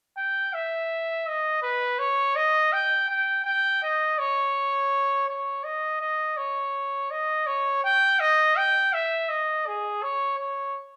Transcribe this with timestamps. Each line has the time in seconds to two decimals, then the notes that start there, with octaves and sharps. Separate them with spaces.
0.17 G5
0.54 E5
1.27 D#5
1.63 B4
1.99 C#5
2.36 D#5
2.72 G5
3.09 G5
3.45 G5
3.83 D#5
4.18 C#5
5.28 C#5
5.64 D#5
6.01 D#5
6.37 C#5
7.11 D#5
7.47 C#5
7.84 G5
8.20 D#5
8.57 G5
8.93 E5
9.29 D#5
9.67 G#4
10.03 C#5
10.39 C#5